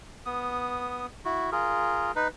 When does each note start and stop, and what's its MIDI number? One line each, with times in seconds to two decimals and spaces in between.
0.26 1.06 59
0.26 1.06 87
1.25 1.50 64
1.25 1.50 66
1.52 2.12 65
1.52 2.12 68
1.52 2.12 70
2.16 2.28 63
2.16 2.28 71